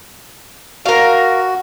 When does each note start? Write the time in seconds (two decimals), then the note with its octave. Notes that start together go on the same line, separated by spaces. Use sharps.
0.85 F#4 A#4 F5